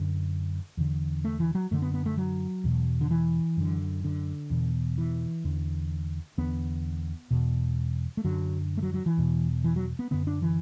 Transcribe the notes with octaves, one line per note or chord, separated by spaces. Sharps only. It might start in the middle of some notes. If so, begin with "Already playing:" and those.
Already playing: F#2 D3
E2 D3
A3
E3
F#3
F#2 D3 A3
B3
B3
A3
F#3
E2 B2
D3
E3
F#2 D3
D3
E2 B2
E3
E2 D3
E2 D3 B3
E2 B2
A3
F#2 D3 F#3
A3
F#3
F#3
E3
E2 B2
E3
F#3
B3
F#2 D3 B3
D4
E3